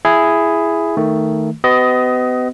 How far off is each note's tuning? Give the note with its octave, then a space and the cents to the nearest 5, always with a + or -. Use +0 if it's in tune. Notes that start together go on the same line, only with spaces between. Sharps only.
E4 +10 G#4 +0
D#3 +10 A3 +15
B3 +35 G4 -45 D#5 +10